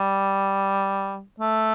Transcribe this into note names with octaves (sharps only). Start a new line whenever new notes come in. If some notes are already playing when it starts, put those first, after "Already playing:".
Already playing: G3
A3